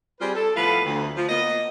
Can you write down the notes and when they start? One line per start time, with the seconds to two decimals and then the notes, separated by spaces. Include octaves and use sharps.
0.20 G3 C4 F4 G4 G#4 B4
0.34 A4
0.55 A2 F3 A3 B3 B4 F5
0.85 D2
1.16 F3
1.29 A#3 B3 D#5